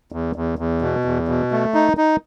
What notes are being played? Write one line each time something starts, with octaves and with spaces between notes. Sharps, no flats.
E2
E2
E2
B2
E2
B2
A3
D#4
D#4